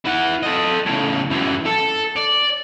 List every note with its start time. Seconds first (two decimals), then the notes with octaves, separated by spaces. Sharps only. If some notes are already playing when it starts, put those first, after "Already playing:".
0.05 E4 F#5
0.43 A4 D#5
0.86 A2 C#3
1.30 F#2 E3
1.66 A4
2.16 D5